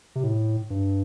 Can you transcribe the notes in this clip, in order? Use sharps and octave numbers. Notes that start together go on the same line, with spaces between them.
C3
A2
G2